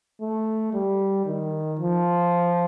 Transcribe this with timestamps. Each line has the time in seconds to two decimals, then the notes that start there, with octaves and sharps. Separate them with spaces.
0.21 A3
0.73 G3
1.26 D#3
1.79 F3